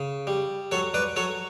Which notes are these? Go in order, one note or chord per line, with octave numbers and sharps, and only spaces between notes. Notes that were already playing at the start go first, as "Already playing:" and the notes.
Already playing: C#3
G3
F#3 A4 C#5
B4 D5
F#3 A4 C#5